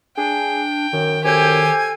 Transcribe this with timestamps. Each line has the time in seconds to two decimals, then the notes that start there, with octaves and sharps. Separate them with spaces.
0.17 D4 G#4 G5
0.93 F#2 D#3
1.24 F#2 G4 A4 C5 G#5